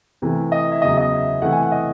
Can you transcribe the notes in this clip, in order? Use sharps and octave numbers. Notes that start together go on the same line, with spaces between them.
C3 E3 A3
D#5
E5
E2 C#3 F#3 D#5
D#5
E5
C3 E3 A3 F#5
G#5
F#5
D#5